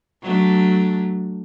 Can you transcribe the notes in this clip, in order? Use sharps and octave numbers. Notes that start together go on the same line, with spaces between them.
F#3 A3 D4